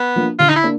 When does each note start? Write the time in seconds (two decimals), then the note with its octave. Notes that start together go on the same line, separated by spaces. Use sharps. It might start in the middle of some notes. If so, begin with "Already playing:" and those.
Already playing: B3
0.16 F3 A#3 D4
0.39 D3 F4
0.49 D#4
0.56 E4
0.63 A#3 D4